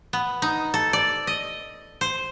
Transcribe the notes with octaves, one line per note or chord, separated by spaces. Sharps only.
B3
D#4
A4
D5
D#5
C5